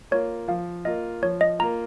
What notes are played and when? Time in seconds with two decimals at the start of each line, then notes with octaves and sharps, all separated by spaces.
0.11 A#3 F4 C#5
0.48 F3 F5
0.85 A#3 F4 D#5
1.22 F3 C#5
1.41 D#5
1.59 A#3 F4 A#5